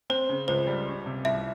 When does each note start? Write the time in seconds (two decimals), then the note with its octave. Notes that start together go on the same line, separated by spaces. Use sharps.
0.10 C4 C5
0.29 C#3
0.48 C#2 C5
0.67 G3
0.87 C#4
1.06 C3
1.25 C2 E5